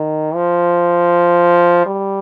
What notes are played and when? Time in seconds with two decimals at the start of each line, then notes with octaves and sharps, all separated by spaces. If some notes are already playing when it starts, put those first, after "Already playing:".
Already playing: D#3
0.35 F3
1.86 G3